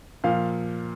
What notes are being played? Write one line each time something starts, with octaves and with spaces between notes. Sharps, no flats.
A#2 F3 F5